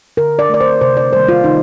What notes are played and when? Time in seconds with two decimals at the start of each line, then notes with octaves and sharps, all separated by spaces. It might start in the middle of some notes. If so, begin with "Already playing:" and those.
0.17 D3 A#4
0.39 D5
0.49 A3 D5
0.60 C5
0.81 C3 C5
0.97 D5
1.13 D#3 G3 A#3 C5
1.28 F4
1.44 D#3 D#4